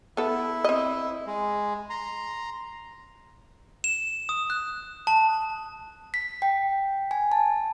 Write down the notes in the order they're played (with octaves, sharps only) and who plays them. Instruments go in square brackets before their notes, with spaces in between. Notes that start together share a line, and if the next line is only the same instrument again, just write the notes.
[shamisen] B3 A4 [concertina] E4
[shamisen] C4 D#5
[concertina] G#3
A#5 C6
[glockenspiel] E7
D#6
F#6
A5
[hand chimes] B6
G5
G#5
A5